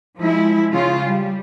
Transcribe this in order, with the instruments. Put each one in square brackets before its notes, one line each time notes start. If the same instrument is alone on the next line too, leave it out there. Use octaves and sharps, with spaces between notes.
[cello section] F3 G#3 E4
C#3 F4
G3